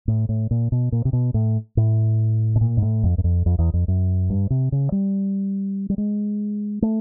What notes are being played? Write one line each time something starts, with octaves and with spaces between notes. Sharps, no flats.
A2
A2
A#2
B2
A#2
C3
B2
A2
A2
B2
A#2
G#2
A2
F2
F#2
F2
F2
E2
F2
F#2
G2
C3
C#3
G3
G3
G#3
A3